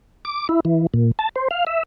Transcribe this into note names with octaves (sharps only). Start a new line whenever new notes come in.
D6
E4
E3
A#2
A5
C5
F5
E5